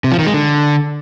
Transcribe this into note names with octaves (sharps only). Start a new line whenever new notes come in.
C3
F3
D#3
G#3
D3